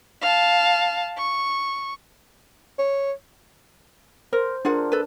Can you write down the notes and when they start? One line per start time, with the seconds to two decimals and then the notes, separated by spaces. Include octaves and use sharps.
0.21 F5 A5
1.18 C#6
2.78 C#5
4.33 A#4 C5
4.65 D4 F4 G#4 A#4 F#5
4.92 A4 B4